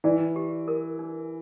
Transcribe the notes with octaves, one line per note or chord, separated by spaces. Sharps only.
E3 D5
G4
A#4
D4